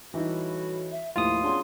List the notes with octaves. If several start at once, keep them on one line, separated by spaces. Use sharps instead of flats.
A2 E3 G3 D#4 E4 F#4
E5
D#2 A2 F3 E4 F4 D#6
F#3 B3 C#4 D4 G#4 C6